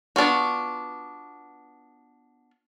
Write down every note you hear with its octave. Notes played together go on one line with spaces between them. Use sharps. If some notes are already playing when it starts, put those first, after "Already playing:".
B3 D4 F4 F#4